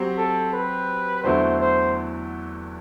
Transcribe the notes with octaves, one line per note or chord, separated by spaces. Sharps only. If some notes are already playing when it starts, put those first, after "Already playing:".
Already playing: F#3 C4 G4
A4
B4
E2 D3 F#3 A3 E4 C5
C5